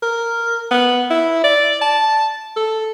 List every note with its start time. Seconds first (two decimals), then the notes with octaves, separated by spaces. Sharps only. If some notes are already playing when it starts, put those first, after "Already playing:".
0.03 A#4
0.71 B3
1.11 E4
1.44 D5
1.82 A5
2.57 A4